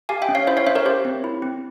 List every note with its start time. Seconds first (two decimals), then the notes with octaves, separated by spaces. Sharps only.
0.09 G4 F5 G#5
0.22 E5 G5
0.29 C#4
0.35 C#5 F5
0.47 E4 C5 E5
0.57 C#5 F5
0.67 C#4 C5 E5
0.75 A#4 C#5
0.85 G4 C5
1.05 C4
1.24 E4
1.42 C4